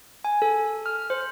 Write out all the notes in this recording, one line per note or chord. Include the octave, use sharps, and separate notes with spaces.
G#5
A4
F6
C5